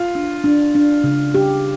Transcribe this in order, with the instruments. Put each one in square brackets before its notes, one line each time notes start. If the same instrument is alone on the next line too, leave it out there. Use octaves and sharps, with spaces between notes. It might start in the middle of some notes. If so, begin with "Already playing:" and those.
Already playing: [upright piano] F4
[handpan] D4
D4
D4
C#3
G4